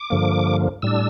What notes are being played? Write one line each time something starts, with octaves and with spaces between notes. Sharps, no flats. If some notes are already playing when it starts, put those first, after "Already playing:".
Already playing: D6
G2 D3 F3 A#3
A2 G3 D4 E6